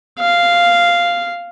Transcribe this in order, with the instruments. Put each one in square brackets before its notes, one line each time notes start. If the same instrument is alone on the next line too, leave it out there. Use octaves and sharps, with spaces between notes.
[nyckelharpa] F5